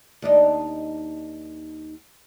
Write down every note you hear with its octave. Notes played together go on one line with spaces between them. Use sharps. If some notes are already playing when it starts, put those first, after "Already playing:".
D#2 D4 D#4